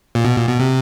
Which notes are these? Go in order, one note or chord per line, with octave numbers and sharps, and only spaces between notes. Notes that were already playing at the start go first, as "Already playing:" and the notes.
A#2
B2
A#2
B2
C3